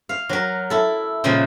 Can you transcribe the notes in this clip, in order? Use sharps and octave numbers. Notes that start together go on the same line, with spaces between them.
F5
F#3 A#4
E4 A4
A#2 C#3 F3 G#3 A#3